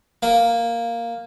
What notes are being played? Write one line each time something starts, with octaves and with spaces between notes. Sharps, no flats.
A#3